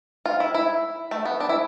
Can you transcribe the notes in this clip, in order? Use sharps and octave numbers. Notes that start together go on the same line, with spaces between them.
F4
E4
E4
A3
B3
D4
E4